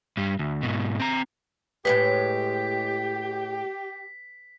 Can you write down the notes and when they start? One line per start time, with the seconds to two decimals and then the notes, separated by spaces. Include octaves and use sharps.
0.17 G2 G3
0.39 D2
0.63 G#2 B2
1.00 C4 A#5
1.85 A2 D3 G#3 G4 B4 B6